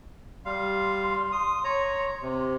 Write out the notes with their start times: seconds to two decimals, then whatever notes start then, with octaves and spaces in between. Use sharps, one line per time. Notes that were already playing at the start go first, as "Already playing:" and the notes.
0.46 G3 F5 C6
1.32 D#6
1.64 C#5 A#5
2.22 C3